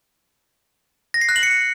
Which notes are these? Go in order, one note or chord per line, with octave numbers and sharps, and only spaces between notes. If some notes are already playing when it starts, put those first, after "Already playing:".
A#6
C7
F#6
F#7
C#7